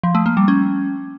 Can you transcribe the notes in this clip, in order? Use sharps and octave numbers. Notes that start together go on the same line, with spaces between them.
F3
A3
A#3
G3
C#4